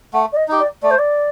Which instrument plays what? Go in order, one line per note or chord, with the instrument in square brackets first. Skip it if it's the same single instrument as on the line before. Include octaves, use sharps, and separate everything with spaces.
[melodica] A3 [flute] F#5
[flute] D5
D#5
[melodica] D#4 G4
[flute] D5
[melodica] A3 [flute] D5
[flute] C5
D5